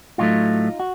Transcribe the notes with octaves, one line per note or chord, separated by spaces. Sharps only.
A2 F#3 A3 D#4 F4
F#4